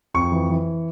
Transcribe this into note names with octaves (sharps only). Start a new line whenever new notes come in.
F2 C#6
E3
E3